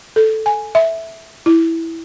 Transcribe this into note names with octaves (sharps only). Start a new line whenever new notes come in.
A4
G#5
E5
E4